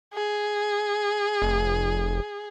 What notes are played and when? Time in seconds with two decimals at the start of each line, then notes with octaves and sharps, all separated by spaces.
0.14 G#4
1.42 F1